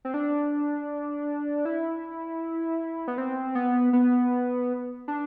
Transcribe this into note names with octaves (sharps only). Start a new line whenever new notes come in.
C4
D4
E4
B3
C4
B3
B3
D4